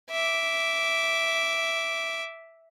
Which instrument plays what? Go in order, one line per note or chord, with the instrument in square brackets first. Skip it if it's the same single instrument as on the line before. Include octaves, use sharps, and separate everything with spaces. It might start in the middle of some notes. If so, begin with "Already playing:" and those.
[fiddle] E5 D6